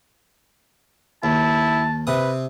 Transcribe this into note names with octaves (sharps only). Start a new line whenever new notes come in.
D#2 E4 A5
C3 B4 D#6